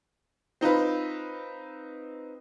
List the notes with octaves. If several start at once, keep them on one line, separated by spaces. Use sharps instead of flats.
C4 D#4 F4 B4